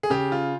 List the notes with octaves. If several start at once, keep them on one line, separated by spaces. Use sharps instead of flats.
G#4
C#3 G4
F4